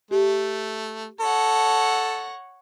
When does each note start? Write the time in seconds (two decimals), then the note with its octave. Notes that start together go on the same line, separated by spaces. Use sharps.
0.11 A3 G4
1.20 A4 C#5 F#5 A#6